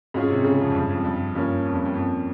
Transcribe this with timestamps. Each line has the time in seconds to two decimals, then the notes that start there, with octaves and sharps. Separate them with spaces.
0.14 G#2 G#3 C#4 F4 G#4
0.30 C3
0.44 C#3
0.60 F2
0.70 F2
0.75 G2
0.90 F2
1.04 G2
1.35 G2 F3 A#3 C#4
1.65 F2
1.74 G2
1.85 G2
1.94 F2